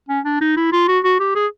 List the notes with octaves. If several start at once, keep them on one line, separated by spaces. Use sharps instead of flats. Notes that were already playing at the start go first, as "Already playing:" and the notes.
C#4
D4
D#4
E4
F4
F#4
F#4
G4
G#4